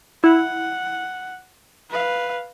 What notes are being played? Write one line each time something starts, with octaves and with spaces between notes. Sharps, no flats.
E4 F#5
B4 F5